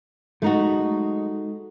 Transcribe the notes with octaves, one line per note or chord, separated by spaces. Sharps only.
F#3 G#3 A3 D#4 F#4